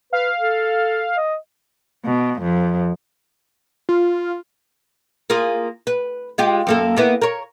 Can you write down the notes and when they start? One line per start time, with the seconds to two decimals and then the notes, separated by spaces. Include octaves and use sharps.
0.13 B4 F5
0.40 A4
1.17 D#5
2.05 B2
2.42 F2
3.89 F4
5.30 A#3 F4 G#4
5.87 B4
6.38 G#3 F4 G4
6.67 F#2 A#3 A4
6.97 A#3 B3 E4
7.22 A#4 C#5